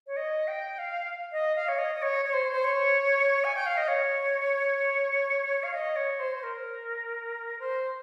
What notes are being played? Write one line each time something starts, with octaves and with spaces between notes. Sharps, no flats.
C#5
D#5
G5
F5
D#5
F5
C#5
D#5
D#5
C#5
C#5
C5
C5
C#5
G#5
G5
F5
D#5
C#5
F5
D#5
C#5
C5
C5
A#4
C5